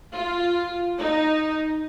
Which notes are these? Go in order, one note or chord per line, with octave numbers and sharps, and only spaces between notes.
F4
D#4